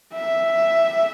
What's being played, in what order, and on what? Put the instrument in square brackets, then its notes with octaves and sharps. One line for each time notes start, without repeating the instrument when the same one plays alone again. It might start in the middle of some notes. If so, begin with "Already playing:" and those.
[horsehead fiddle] E5